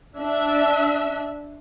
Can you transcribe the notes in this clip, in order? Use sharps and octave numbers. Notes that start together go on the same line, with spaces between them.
D4 E5